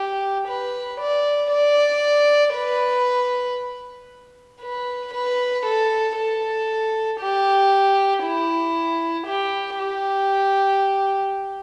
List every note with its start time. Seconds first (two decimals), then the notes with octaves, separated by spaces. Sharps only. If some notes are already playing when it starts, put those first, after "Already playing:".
Already playing: G4
0.48 B4
1.01 D5
1.51 D5
2.55 B4
4.62 B4
5.14 B4
5.66 A4
6.18 A4
7.21 G4
8.24 E4
9.27 G4
9.79 G4